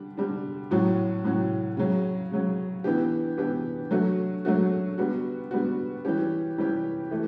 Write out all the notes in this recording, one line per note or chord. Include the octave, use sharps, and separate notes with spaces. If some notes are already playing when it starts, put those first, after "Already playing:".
Already playing: D3 G3 D4
D3 G3 D4
A2 F#3 C#4 F#4
A2 F#3 C#4 F#4
C#3 F#3 C#4
C#3 F#3 C#4
E3 B3 D4 G4
E3 B3 D4 G4
F#3 A3 D4 F#4
F#3 A3 D4 F#4
D3 G3 B3 F#4
D3 G3 B3 F#4
E3 G3 C#4 G4
E3 G3 C#4 G4
E3 A3